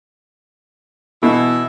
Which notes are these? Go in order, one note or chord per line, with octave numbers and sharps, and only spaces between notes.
B2 E3 E4